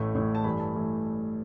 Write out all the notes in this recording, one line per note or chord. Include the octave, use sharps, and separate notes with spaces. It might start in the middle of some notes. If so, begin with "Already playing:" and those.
Already playing: A1 A2 A3
A1 A2 A3
A5
G2 E3 A3 B5
A5
E3 A3